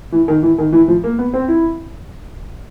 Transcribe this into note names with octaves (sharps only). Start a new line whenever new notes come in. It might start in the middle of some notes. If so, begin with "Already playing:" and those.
E3
D#3
E3
D#3
E3
F3
A#3
B3
C4
E4